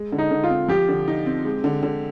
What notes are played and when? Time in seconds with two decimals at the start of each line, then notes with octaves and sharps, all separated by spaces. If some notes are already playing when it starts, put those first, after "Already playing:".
Already playing: G#3
0.12 D3
0.18 D#4
0.31 D3
0.44 F4
0.50 C4
0.68 F3 G4
0.89 D3
1.08 D#4
1.26 C4
1.45 G#3
1.64 D3
1.83 D3